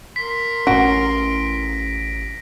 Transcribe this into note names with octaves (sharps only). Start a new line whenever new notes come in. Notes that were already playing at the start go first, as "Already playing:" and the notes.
A#4 C6 B6
A1 A2 C#4 F#4 A#6 D7